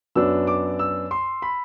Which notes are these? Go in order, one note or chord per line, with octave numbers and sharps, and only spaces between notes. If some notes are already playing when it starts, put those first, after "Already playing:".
F#2 F#3 B3 D4 E6
D6
E6
C6
B5